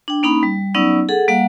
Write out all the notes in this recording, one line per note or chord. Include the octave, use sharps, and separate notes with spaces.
D4 G5
A#3 C#4 D#4 B5
G3
F#3 B3 C#4 D#4 D5 E6
G#4 A4 F#5
G3 A#3 F5 F#5